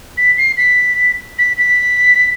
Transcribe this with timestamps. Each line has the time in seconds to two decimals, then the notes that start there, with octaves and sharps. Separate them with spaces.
0.17 B6
0.38 C7
0.57 B6
1.38 B6
1.58 B6